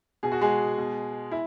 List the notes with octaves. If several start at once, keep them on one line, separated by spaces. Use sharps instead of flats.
B2 G#4
F#4
G#3 G#4
B2
E4